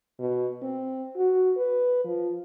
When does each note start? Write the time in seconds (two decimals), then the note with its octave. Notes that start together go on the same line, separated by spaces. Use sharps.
0.19 B2
0.63 C4
1.17 F#4
1.57 B4
2.04 F3